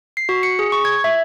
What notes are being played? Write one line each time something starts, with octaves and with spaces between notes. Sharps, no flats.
C7
F#4
C#7
G#4
C#6
G#6
E5